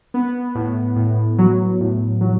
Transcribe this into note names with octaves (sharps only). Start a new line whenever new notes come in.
B3
A2
A2
F#3
A2
F#3